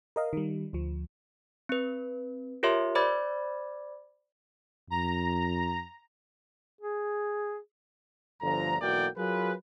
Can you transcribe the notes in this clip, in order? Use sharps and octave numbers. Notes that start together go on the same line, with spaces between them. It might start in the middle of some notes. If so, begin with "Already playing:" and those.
A#4 D#5 F5
D#3 G3
D2 F3
C4 B4
F4 G4 A#4 C#5 E5 C6
C5 D5 B5 D6 G#6 A6
F2 A#5
G#4
G1 D2 D3 F3 A#5
B1 E3 A#3 F#4 D5 G5
F#3 F4 G#4 A#4 B4